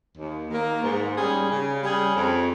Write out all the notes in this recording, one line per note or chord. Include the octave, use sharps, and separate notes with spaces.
D#2
D#3 A#3
G#2
G3 C#4 G#4
C#3
G3 C#4 G#4
F2